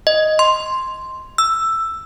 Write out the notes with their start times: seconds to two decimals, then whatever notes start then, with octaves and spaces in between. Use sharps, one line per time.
0.07 D#5
0.39 C6
1.38 E6